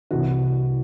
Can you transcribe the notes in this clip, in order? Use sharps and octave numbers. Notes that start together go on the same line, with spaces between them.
C2 C3 E3 F#4